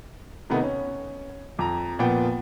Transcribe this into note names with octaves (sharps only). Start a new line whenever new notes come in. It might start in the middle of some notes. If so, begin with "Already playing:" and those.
C3 D#3 A3 B3 D#4
C#4
F2 A#5
A#2 F3 B3 G5